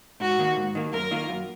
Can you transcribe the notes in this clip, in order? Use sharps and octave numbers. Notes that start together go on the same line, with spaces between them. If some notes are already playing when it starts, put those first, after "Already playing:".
G#2 F#4
D#3 A#3
G#2
D#3 A#3
F#2 A#4
D#3 A#3 F4
F#2